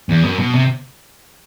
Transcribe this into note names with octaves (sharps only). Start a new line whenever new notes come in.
E2
F#2
B2
C3